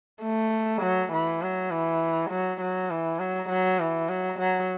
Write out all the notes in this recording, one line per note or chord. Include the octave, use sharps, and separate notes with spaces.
A3
F#3
E3
F#3
E3
F#3
F#3
E3
F#3
F#3
E3
F#3
F#3